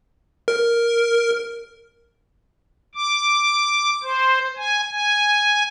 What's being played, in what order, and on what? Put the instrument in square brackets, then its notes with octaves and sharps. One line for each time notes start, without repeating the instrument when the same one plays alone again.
[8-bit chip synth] A#4
[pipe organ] D6
C5
G#5
G#5